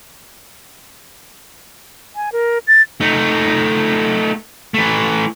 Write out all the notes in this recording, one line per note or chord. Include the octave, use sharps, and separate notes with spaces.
G#5
A#4
A6
A3 D#4
E3 A3